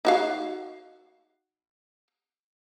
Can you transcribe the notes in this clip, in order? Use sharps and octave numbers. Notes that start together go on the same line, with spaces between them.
D#4 F#4 F5